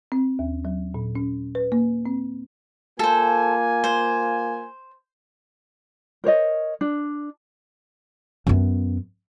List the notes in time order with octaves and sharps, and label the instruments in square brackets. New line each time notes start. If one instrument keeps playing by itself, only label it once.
[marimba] C4
D#2
F#3
A#2
C#4
B4
A#3
C4
[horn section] A#3 F4 G#5 [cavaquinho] A4 C5
[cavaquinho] C5
[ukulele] A#4 C5 C#5 D#5
D4
[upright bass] F#2 B3